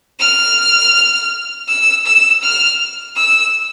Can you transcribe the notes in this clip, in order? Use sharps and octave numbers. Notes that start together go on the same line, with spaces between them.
F6
E6
E6
F6
E6